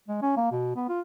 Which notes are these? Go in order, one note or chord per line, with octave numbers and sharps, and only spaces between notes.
G#3
C#4
A#3
B2
B3
F4